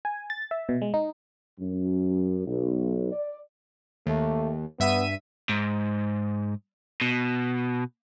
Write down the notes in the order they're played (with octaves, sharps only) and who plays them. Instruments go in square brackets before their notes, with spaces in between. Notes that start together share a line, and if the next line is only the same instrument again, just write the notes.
[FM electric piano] G#5
A6
E5
B2
G#3
D#4
[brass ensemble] F#2
B1
D5
[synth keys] D#2 [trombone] A3
[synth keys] G2 E5 D#7 [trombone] B3
[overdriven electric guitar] G#2
B2